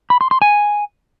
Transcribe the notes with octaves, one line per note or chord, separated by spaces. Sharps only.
B5
C6
C6
G#5